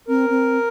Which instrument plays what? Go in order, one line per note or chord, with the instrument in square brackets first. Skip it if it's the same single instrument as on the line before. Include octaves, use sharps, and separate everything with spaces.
[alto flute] C4 [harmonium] A#4
[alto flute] C4